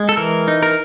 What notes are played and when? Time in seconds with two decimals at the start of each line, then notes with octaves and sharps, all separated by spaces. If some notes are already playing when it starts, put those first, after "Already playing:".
Already playing: G#3
0.09 A4
0.17 E3 A#4
0.48 D#4
0.63 A#4